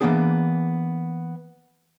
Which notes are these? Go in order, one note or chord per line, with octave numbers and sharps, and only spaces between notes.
E3 F#3 A#3 B3 D4 G#4